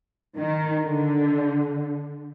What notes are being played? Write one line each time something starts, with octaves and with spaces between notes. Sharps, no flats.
D#3
D3